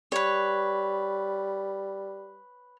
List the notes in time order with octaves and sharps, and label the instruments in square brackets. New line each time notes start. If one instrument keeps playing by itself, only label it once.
[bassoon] G3 [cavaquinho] B4 C#5